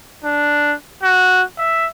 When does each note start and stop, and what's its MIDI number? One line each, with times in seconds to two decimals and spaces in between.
0.24 0.74 62
1.03 1.43 66
1.58 1.86 76